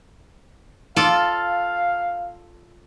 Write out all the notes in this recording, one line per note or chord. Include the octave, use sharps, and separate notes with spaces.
F4 A4 D5 F5